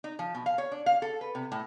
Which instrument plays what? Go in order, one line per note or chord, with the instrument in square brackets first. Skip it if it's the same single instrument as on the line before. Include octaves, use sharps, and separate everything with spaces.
[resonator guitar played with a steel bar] D#4
F3
B2
F5
C#5
D4
F5
A4
B4
C3
A2